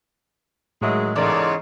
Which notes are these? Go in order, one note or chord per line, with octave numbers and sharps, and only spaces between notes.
A2 D#3 F#3 G#3 E5
E2 G#2 C#3 A4 A#4 D5